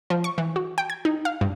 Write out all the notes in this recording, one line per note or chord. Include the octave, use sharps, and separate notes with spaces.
F3
C#6
E3
F#4
G5
G#6
D#4
F5
G2